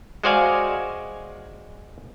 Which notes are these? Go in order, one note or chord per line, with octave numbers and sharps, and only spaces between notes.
G#3 F#4 C5 D5 F5 G#5